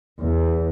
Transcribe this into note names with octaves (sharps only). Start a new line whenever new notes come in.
E2